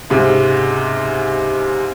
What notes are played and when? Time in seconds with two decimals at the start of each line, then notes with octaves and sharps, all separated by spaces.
0.10 C#2 G#2 C3